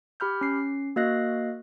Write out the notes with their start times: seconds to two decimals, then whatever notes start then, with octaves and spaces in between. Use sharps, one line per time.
0.20 G4 B5 F6 G6
0.41 C#4 C7
0.96 A#3 F#4 D#5 F5 F#6 A#6